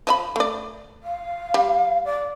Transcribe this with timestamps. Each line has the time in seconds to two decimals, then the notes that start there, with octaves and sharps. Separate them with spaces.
0.07 F3 E5 B5
0.36 A3 D5
1.03 F5
1.54 G3
2.05 D5